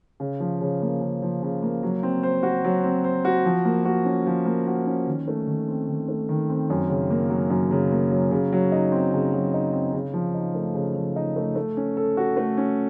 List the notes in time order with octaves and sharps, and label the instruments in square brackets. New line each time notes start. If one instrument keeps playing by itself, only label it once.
[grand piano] C#3
F3
C#3
A#3
C#3
F3
C#3
A#3
F#3
C4
C5
F#4
F#3
C4
C5
F#4
F3
A#3
F#4
C#4
F3
A#3
F#4
C#4
D#3
A3
D#3
C4
D#3
A3
D#3
C4
F#2
C#3
A#3
F#3
F#2
C#3
A#3
F#3
C#3
F#3
D#4
C4
C#3
F#3
D#4
C4
C#3
F3
D#4
A3
C#3
F3
D#4
A3
A3
C#4
A4
F#4
A3
C#4